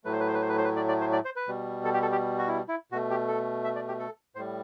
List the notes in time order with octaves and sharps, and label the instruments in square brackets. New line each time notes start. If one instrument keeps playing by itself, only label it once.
[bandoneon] A2 F#3 A3 B4
C5
B4
C5
B4
C5
B4
C5
B4
D5
D5
C5
D5
C5
B4
B2 G3
A4
G4
A4
G4
F#4
E4
E4
B2 F#4
A3
G4
A4
E5
D5
G4
A4
A2 G3 C5